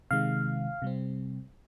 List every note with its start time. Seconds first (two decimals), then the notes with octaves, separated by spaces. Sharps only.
0.11 C3 D#3 G#3 F5
0.82 C3 G3 C4